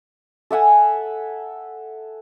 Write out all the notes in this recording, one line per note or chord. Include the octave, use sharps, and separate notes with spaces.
A4 E5 F#5 G#5